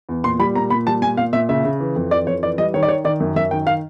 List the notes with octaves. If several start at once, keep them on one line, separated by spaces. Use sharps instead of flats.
E2
A#2 C6
G3 B5
A#2 A#5
A#2 B5
G3 A5
A#2 G#5
A#2 F5
A#2 E5
C#3 E5
C#3
E3
F2
E3 D5
F2 C#5
E3 D5
G3 D#5
D#3 C#5
D5
D#3 C#5
D#3 D5
F#2
F#2 E5
D#3 G5
F5